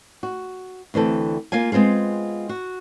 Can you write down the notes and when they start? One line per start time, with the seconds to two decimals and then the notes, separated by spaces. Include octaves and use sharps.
0.23 F#4
0.94 D2 E3 C4 A4
1.52 A#3 F4 F5 G#5
1.72 G#3 B3 C4 F4 G#4
2.49 F#4